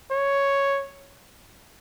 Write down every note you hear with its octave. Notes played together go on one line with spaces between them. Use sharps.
C#5